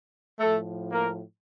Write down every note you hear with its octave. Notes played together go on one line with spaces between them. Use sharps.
A2 F3 A3 A4
A#3 A#4